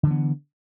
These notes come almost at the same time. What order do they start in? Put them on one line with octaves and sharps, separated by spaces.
D3 E3 B3